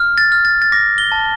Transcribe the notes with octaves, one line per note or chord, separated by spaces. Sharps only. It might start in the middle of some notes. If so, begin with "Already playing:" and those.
Already playing: F6
A6
F6
A6
A6
D6 A#6
G7
A5